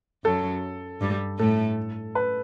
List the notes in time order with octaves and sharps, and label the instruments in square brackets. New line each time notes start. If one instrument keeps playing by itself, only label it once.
[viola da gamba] F#2 F#3 [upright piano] A4
[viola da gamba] G2 G3
[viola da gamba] A2 A3 [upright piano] A4
[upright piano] B4